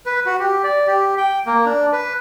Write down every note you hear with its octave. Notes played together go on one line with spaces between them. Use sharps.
B4
F#4
G4
D5
G4
G5
A#3
D4
B4